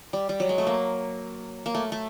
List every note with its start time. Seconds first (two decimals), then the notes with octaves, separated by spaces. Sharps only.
0.13 G3
0.29 G3
0.40 F#3
0.49 G#3
0.58 A3
0.67 A#3
1.66 A#3
1.75 A3
1.92 A3